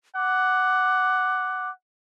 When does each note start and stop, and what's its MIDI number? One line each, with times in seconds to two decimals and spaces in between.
0.16 1.72 78
0.16 1.70 86